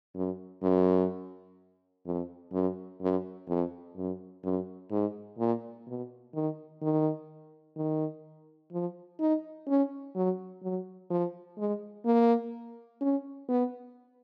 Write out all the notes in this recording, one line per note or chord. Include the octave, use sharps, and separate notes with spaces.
F#2
F#2
F2
F#2
F#2
F2
F#2
F#2
G#2
A#2
B2
D#3
D#3
D#3
F3
D#4
C#4
F#3
F#3
F3
G#3
A#3
C#4
B3